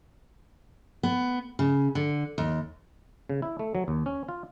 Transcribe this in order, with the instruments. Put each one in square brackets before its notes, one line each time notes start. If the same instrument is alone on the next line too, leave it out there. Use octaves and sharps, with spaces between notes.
[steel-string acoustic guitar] B3
C#3
D3
D#2
[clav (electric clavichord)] C#3
E4
A3
F#3
D#2
C#4
F4